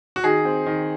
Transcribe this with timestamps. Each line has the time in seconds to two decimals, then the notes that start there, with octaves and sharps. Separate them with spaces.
0.16 F#4
0.23 D#3 G#4
0.45 C4
0.66 D#3